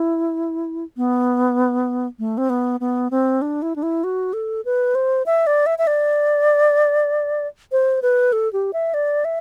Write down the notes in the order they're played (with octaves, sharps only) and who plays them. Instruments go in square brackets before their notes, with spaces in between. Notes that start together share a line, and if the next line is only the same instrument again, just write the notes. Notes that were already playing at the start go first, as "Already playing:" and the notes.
Already playing: [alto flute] E4
B3
A3
C4
B3
B3
C4
D4
E4
D4
E4
F#4
A4
B4
C5
E5
D5
E5
E5
D5
C5
B4
A4
G4
E5
D5
E5